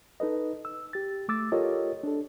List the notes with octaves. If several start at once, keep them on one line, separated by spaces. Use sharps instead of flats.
D#4 A4 B4 D#5
E6
G4 A6
A3 D6 E6 A6
F4 G4 A4 A#4 C#5 D#5
D4 A4